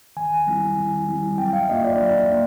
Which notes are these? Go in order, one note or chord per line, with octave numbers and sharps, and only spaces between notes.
D#3 G#5
G3 C4 E4
D#3
G3 C4 E4
F#3 G5
F5
E5
A#3 D4 F4 D#5
D5
F#3
A#3 D4